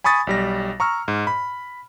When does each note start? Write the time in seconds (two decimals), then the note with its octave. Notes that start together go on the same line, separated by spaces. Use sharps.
0.04 G#5 B5 C#6 D#6 A6
0.27 B1 G3 A#6
0.80 A#5 C#6 E6 F6
1.08 G#2
1.27 B5